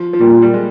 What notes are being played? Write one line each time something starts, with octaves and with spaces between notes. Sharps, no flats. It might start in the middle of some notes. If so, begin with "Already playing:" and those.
Already playing: F3
F3
A#2 G3
G3
G#3